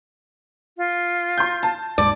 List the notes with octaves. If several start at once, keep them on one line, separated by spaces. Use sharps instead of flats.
F4
C6 G6
A5
D#1 G#2 D5